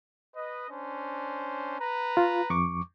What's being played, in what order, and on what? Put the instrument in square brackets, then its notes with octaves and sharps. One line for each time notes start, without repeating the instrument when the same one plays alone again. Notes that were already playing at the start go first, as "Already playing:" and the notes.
[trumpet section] B4 D#5
C#4 D4 C5
B4 A#5
[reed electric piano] F4
F2 C#6 D6